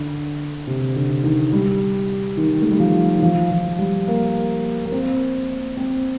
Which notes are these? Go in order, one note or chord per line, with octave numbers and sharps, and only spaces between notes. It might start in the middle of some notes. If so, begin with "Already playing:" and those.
Already playing: D3
C3
D3
D#3
G3
D#3
A3
G3
F3
D#3
F3
F3
G3
A#3
A#3
C4
C4